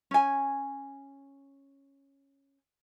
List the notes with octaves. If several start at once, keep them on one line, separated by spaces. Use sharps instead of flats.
C#4 G#5